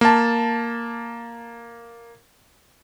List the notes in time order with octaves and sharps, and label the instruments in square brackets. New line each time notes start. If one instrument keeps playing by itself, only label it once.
[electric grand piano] A#3 A5